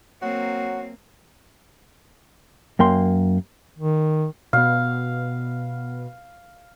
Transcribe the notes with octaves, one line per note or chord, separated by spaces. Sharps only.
F#3 A#3 C4 F#4
F#2 A#3 G5 C6
D#3
B2 B3 F5